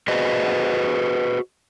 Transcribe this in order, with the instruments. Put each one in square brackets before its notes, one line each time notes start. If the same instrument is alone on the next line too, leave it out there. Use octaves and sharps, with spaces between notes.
[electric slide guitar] F#4 G#4 B4 C5 D#5